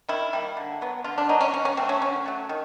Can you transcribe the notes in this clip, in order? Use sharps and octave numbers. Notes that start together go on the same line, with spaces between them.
D#3 E4
G3 A#3
D3
F#3 B3
D3 F4
D4
F#3 B3 D#4
C#4
D3 C#4
C#4
F#3 A3 C4
C#4
D3 C#4
F#3 A3
D#3